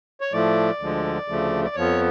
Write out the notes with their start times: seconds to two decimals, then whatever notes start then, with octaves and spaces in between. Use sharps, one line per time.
0.21 C#5
0.32 A2 F3 A3 D5
0.80 D2 D3 F3 G#3
1.28 D2 C#3 F3 A3
1.65 D5
1.75 F2 F3 B3 C#5